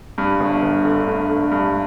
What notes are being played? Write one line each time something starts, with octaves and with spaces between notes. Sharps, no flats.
G2
G1
G1
D3
A3
A3
G2